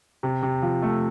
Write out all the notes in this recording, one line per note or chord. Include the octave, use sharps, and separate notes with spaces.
C3
C3
F3
A3